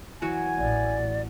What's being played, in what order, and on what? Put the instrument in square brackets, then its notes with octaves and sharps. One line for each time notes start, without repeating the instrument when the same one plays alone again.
[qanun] E3 F#3 F#4 [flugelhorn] G#5
[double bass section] A1 [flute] D5